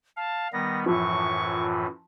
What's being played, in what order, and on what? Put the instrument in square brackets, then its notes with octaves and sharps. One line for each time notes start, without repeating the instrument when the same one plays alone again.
[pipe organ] F5 [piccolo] A5
[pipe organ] D#3 G3 B3 [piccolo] A#6
[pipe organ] F#2 A2 E3 [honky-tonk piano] F3 [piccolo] C#6